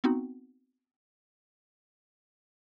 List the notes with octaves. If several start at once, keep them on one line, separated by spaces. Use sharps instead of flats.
B3 C4 D#4 F#4 F#5